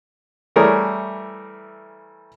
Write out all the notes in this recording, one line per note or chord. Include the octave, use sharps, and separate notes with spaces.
E3 G3 A3 G#4 A#4 C#5